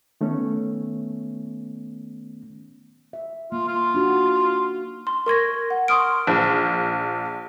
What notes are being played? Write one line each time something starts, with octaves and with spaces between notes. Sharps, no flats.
D#3 A3 B3 C#4
E5
A#3 F4
F4
D4 D#4 F#4
C6
A#4 C#6 G#6 A#6
F#5
C6 C#6 D#6 F6 D7
A#1